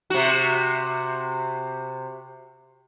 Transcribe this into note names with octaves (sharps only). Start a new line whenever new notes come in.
C3 F#4